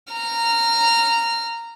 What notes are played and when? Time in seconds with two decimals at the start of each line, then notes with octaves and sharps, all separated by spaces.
0.12 A#5 F6